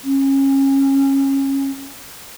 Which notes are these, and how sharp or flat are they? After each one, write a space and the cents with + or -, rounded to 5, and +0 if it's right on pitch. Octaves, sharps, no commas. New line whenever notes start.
C#4 -25